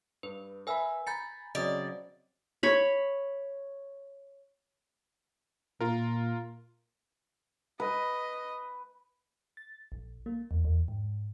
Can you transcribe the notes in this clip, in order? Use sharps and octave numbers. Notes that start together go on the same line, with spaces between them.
G2 B4
A#4 B4 E5 G#5 B5 E6
G#5 A#5 B5 G6 A6 C#7
C#3 F#3 C4 D5 D#5 D#6
C#5 B5
A#2 F4 A#4
B4 D#5
A6
A#1
A#3
E2
E2
G#2